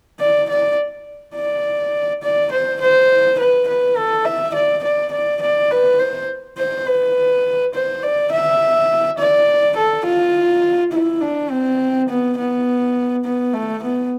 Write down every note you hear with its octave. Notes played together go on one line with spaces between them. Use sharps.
D5
D5
D5
D5
C5
C5
B4
B4
A4
E5
D5
D5
D5
D5
B4
C5
C5
B4
C5
D5
E5
D5
A4
F4
E4
D4
C4
B3
B3
B3
A3
B3